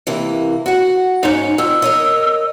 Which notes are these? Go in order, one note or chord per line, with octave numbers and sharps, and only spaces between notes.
C3 E3 A#3
F#4 F#5
G#2 C#4 D#4
F2 E6
A#4 C#5 D#5